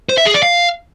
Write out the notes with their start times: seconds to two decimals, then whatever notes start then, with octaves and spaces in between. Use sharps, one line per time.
0.09 C5
0.18 E5
0.26 G#4
0.34 D5
0.43 F5